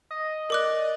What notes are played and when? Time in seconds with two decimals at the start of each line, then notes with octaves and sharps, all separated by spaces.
0.11 D#5
0.50 A#4 D5 D6 F#6